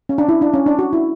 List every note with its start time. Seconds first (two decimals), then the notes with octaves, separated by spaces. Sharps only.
0.09 C#4
0.18 D4
0.29 E4
0.41 D4
0.54 C#4
0.66 D4
0.79 F#4
0.93 E4